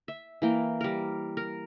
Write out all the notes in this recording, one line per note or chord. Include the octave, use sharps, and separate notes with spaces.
E5
E3 A#3 G5
G3 A#4
A#4